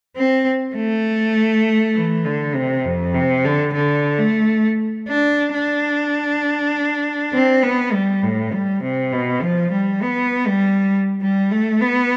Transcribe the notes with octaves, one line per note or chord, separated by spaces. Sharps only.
C4
A3
E3
D3
C3
F2
C3
D3
D3
A3
D4
D4
C4
B3
G3
A2
G3
C3
B2
F3
G3
B3
G3
G3
A3
B3